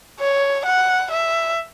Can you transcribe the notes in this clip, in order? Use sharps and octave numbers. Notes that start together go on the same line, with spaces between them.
C#5
F#5
E5